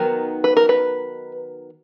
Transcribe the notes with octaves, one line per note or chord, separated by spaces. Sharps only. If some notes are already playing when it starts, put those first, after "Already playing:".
Already playing: D#3 F#3 B3 D#4 A#4
B4
A#4
B4